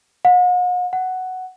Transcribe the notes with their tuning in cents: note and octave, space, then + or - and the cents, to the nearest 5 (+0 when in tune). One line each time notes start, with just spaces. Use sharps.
F#5 -45
F#5 +5